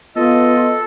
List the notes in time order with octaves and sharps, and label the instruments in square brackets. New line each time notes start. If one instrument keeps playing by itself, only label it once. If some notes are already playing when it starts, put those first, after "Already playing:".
[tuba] B3 [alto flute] F4 [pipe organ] A4 [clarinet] D#5